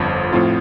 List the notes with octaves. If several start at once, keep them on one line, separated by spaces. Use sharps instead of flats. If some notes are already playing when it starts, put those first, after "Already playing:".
Already playing: G1 F2 F3
A2 F3 C4 F4